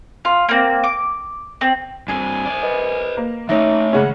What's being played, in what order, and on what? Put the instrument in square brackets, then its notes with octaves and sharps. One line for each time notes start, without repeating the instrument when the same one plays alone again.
[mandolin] F4
A#3 C4
D6
C4
[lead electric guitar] G2 C4 [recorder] G#5
[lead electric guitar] C5 D5
[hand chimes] B4 D#5
[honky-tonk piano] A#3
[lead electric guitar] E3 A3 [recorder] D#4 [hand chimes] C#5 E5
[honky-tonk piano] C#3 G#3 C#4 [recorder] F#5